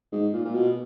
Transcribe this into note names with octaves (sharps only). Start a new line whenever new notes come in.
G#2
A#2
A#2
B2